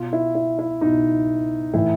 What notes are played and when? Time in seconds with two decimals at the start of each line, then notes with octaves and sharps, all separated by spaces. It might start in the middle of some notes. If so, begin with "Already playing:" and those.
Already playing: B2 F4
0.13 E4
0.35 E4
0.59 E4
0.81 B2 D#4
1.73 A2 E3 E4